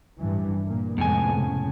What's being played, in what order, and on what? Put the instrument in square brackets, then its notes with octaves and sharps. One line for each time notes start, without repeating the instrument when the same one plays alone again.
[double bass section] A1 G2 E3
A#2 A#3
[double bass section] F2 G#3 B3 [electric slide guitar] A2 C3 G#5
[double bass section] C#3